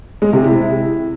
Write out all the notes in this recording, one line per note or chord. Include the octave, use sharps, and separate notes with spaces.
G#3
C3
E4